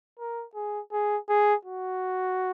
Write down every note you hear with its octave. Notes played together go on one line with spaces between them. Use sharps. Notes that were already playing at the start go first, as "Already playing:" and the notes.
A#4
G#4
G#4
G#4
F#4